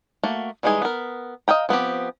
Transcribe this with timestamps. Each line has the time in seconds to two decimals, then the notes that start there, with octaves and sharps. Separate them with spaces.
0.23 A3 A#3 F#4
0.63 E3 G3 G#3 D#4 G#4
0.82 B3 A#4
1.48 D#5 F5 G5 A#5
1.69 F3 B3 C4 G4